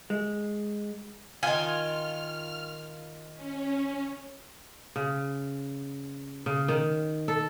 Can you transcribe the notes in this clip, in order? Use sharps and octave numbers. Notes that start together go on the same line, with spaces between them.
G#3
D#3 F4 G#5 F6
C#4
C#3
C#3
D#3
A4